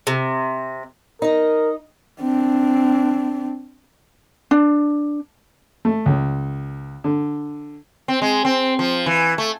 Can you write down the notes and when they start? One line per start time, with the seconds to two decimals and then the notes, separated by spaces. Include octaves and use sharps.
0.07 C3
1.22 D#4 A#4 D#5
2.22 C4 D4
4.51 D4
5.85 A3
6.06 C#2
7.04 D3
8.08 C4
8.22 G#3
8.45 C4
8.79 F3
9.06 E3
9.38 A3